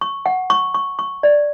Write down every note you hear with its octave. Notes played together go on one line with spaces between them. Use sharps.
C#6
F#5
C#6
C#6
C#6
D5